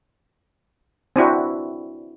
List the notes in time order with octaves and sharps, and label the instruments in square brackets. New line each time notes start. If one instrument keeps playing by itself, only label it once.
[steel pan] C4 D4 E4 F#4